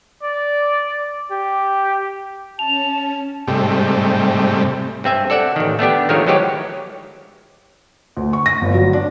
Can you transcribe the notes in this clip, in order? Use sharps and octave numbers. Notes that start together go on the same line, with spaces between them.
D5
G4
C#4 A5 F7
G#2 C3 G3 A3
G2 C4 E5 G#5
A4 D5 E5 F#5
A1 D#3
A3 B3 D4 G4
D#3 F3 G#3 A3 A#4 C#5
E3 F#3 G#3 G4 C#5
D2
C#6
A#6
G1
F#3
D4